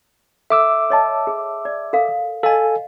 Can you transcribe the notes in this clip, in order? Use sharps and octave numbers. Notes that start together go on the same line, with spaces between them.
A4 E5 D6 E6
C#5 D#5 A5
G#4
D5
A4 A#4 F5
A4 D#5 F5 G#5